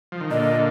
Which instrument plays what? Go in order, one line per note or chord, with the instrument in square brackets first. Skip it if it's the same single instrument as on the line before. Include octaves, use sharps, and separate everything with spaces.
[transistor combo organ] F3
D#3
[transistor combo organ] A#2 D3 [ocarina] D#5